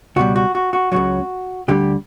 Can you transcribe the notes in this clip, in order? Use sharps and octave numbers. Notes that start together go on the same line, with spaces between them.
C#2 B2 G3 F#4
F#4
F#4
F#4
C#2 C#3 F#3 F#4
D2 D3 G3 G4